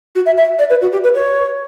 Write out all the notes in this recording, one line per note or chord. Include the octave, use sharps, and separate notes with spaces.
F#4
E5
E5
D5
B4
F#4
G4
B4
C#5